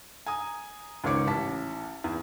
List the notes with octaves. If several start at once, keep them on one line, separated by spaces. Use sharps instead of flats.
G#5 A#5 D#6
C#2 G#2 D#3 C#5 D6 C#7
A1 A5 B6
E2